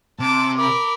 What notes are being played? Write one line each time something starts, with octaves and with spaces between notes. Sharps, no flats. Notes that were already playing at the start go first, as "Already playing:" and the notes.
C3 A5 D6
A#4 B5 D6